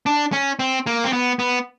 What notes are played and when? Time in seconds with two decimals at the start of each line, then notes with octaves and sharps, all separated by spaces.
0.06 D4
0.32 C#4
0.59 C4
0.86 A#3
1.04 C4
1.13 B3
1.39 B3